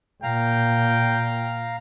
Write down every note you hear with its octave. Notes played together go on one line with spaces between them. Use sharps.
A#2 F5 G5 A#5